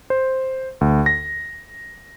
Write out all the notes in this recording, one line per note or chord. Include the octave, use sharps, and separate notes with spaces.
C5
D2
A#6